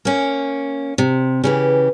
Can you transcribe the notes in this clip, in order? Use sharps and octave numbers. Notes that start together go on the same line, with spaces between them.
A#3 C#4
C3
C#3 E3 G4